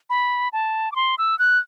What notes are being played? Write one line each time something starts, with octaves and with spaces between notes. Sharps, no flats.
B5
A5
D6
C6
E6
F#6